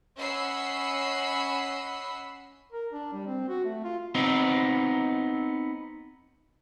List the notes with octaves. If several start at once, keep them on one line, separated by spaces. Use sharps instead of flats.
C#4 D#5 F#5 B5 E6 C7
A#4
D4
G3
C4
F#4
A3
F4
B3 C4 D#4